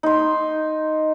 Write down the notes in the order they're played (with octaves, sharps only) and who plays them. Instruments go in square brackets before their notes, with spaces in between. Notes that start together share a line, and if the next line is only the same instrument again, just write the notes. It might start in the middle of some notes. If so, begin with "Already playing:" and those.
[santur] D#4 C6